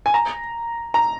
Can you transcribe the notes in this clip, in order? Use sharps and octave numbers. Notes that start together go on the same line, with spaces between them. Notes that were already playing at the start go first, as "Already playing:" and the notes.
G#5
A#5
A#5